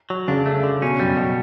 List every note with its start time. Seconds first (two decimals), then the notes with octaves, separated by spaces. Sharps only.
0.10 F#3
0.28 C#3 D4
0.46 A3
0.63 D3
0.81 B2 C#4
0.99 F#2 G3
1.17 B2